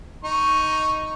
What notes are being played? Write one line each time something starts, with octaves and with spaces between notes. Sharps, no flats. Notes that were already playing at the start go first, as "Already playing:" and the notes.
D#4 C#6